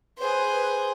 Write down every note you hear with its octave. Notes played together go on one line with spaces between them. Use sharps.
G#4 B4 C5